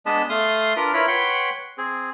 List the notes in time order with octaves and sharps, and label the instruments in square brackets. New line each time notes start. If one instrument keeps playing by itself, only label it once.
[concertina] G#3 B3 D4 B4 D#5 A5
A3 F5 C6 D#6
D4 F4 A#4 B4
E4 F4 A#4 B4 C#5 B5
B4 C#5 F#5 G5 B5 C6
C4 G#4